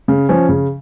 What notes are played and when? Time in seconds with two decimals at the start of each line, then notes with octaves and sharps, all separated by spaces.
0.08 C#3
0.29 F3 C#4
0.49 C#3